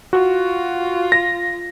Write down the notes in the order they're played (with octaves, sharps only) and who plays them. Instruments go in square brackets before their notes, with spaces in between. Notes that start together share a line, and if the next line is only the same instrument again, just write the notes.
[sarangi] F4 [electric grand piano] F#4
[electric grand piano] A#6